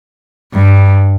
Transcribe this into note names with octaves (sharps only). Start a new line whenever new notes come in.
G2